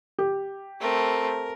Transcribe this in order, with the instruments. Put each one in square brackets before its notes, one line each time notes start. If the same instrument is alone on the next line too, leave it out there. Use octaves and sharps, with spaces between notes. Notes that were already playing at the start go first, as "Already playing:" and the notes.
[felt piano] G4
[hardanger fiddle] A3 C4 [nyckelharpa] A#4